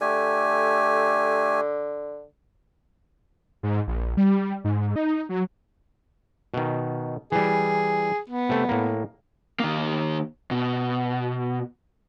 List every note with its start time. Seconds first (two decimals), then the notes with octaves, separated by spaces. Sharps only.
0.01 D3 A3 G4 G#5
3.63 G#2
3.88 A#1
4.17 G3
4.64 G#2
4.96 D#4
5.29 F#3
6.54 B2 D#3
7.32 E3 G3 G#4
8.29 B3
8.49 C3 A3
8.69 A2 A#3
9.60 D#3 A#3
10.51 B2